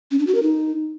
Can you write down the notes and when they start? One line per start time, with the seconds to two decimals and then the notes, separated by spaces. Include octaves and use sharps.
0.11 C#4
0.19 D4
0.27 F#4
0.35 A#4
0.43 D#4